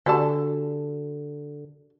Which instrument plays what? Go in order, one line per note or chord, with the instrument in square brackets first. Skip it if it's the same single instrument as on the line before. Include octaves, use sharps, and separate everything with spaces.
[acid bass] D3 [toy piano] D4 F#4 G4 [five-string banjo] A4 D5 A5